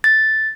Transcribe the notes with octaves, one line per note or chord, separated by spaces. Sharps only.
A6